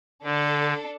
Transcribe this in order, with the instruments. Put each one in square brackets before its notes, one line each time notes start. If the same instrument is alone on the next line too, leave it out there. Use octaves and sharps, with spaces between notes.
[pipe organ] D3 [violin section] D4 A4